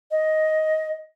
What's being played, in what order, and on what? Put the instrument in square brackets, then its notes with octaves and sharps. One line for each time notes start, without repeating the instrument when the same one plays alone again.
[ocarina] D#5